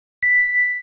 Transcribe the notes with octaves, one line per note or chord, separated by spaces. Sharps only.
B6